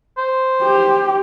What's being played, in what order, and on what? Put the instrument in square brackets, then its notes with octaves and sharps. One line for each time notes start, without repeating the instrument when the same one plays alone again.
[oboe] C5
[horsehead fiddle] G4